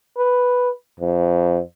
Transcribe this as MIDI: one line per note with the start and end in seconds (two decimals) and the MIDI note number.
0.17 0.70 71
1.00 1.60 41